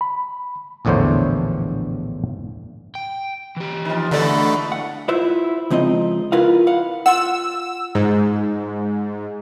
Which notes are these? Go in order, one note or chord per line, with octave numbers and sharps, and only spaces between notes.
B5
A#1 E2 A2 D3 C5 C#5
G5
E3 G4
D#3 F3
E2 B2 D3 A3 D5
F#5
E4 F4 B4 C5 E5
C#2 F3 C4 D#4 D#5
E4 F4 A#4 B4 F5 F#5
F5 F#5
F4 F#5 E6
G#2